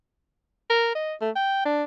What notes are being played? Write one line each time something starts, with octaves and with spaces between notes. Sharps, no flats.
A#4
D#5
A3
G5
D4